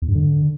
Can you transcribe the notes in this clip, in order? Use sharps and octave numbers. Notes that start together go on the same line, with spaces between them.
E2
G2
D3